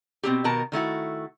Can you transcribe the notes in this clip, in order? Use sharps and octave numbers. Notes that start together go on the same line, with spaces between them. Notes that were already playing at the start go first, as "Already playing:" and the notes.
B2 C4 E4 G4
B2 D#3 A#4 A5
D#3 A3 E4 F#4